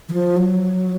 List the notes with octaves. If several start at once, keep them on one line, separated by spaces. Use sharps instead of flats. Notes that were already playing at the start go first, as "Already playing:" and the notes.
E3
F3
F#3